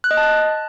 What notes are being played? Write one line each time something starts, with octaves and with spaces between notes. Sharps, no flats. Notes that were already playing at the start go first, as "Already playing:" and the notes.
F#6
D#5
A5